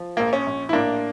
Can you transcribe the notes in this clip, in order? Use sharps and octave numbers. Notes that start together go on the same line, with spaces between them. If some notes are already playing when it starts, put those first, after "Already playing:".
Already playing: F3
A#1 A#3
C#4
A#1
E4
A2 A#3 D4